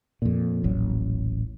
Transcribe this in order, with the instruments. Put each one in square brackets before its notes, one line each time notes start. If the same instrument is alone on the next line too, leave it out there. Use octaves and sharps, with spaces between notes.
[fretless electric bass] F2 A#2
D#1 A1 F#3